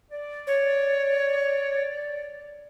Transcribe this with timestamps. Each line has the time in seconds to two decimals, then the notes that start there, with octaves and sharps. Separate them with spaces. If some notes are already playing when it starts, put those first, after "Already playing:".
0.11 D5
0.47 C#5